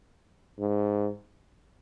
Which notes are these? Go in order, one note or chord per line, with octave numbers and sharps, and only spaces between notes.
G#2